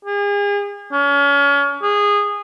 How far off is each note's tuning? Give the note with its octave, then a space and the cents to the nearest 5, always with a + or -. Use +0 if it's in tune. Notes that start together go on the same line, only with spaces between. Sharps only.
G#4 -40
C#4 +35
G#4 -20